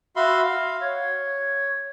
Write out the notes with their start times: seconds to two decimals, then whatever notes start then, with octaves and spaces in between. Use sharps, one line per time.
0.16 F#4 E5 F5 B5 C6
0.42 F5
0.81 C#5